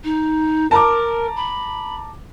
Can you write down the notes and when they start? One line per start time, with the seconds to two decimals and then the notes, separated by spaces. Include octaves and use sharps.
0.04 D#4
0.71 A#4 A5 A#5 D6
1.36 B5